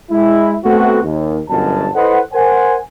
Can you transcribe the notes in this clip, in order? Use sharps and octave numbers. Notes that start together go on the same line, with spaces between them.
G#3 E4
A3 B3 C4 F#4
D#2
G1 F#2 B2 A5
E4 A4 B4 C5 D#5 F#5
A#4 C5 F#5 G#5